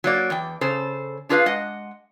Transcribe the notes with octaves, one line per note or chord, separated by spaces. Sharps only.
F#3 A#3 D5
E2 G5
C#3 A4 C5
D4 F4 G#4 B4 D5 F5
G#3 D#5 F#5